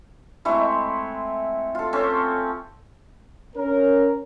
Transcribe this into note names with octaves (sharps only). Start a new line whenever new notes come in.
G#3 A3 C4 E4
F4 A4
C4 C#4 A4
C#4 A#4